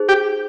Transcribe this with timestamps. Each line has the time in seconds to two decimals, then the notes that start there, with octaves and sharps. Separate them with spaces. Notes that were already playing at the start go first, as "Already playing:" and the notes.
Already playing: D#4 G#4 C5
0.09 G4